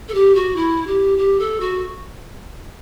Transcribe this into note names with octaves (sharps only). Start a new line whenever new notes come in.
A4
G4
F#4
E4
G4
G4
A4
F#4